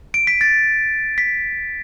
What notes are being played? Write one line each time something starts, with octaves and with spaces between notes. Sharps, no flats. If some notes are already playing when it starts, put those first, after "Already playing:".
D7
B6
A6
B6